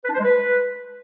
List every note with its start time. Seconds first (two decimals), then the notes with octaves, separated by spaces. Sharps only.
0.04 B4
0.09 D4
0.14 C5
0.19 G#3
0.24 B4